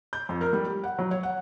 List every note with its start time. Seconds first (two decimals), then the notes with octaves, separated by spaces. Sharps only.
0.13 G6
0.29 F2
0.41 A#4
0.53 G3
0.66 G4
0.84 F#5
0.99 F#3
1.11 C#5
1.23 F#5